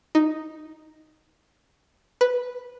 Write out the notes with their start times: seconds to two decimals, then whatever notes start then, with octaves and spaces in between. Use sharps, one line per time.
0.15 D#4
2.21 B4